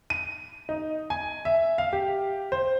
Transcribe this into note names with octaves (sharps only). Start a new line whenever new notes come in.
D#7
D#4
G#5
E5
F5
G4
C5